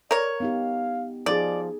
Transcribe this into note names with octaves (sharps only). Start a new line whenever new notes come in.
A#4 C#5 D5
B3 D#4 G4 F5
F3 D#4 G#4 D5